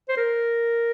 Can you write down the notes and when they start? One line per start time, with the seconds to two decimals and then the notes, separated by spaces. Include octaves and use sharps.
0.09 C5
0.17 A#4